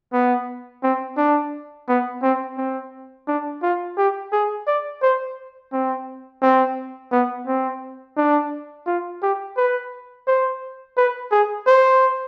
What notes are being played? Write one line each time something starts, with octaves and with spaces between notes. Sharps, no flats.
B3
C4
D4
B3
C4
C4
D4
F4
G4
G#4
D5
C5
C4
C4
B3
C4
D4
F4
G4
B4
C5
B4
G#4
C5